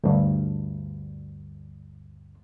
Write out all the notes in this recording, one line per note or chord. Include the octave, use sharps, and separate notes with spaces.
D2 G2